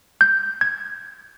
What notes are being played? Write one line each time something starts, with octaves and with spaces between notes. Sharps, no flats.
G6
G#6